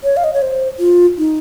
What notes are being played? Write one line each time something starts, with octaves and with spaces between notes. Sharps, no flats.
C#5
F5
D#5
C#5
C5
F4
D#4